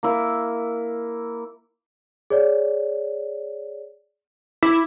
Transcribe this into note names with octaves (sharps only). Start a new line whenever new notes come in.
A#3 E4
G#4 C#5 D5
E4 D6